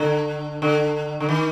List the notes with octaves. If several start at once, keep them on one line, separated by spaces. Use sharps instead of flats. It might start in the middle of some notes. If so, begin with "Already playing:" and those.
Already playing: D3
D3
D3
D#3